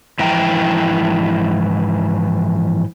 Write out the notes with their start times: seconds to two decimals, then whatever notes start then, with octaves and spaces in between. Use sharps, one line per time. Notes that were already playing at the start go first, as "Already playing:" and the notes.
0.19 G#2 E3 F3 E4 G5 A#5